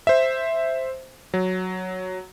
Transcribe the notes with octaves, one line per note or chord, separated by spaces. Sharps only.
C5 E5
F#3